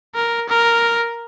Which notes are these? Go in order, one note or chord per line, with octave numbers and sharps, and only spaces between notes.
A#4
A#4